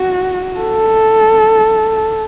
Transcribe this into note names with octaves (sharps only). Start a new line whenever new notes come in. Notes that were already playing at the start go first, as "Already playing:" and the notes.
Already playing: F#4
A4